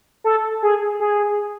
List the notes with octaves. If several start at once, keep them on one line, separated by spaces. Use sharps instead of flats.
A4
G#4
G#4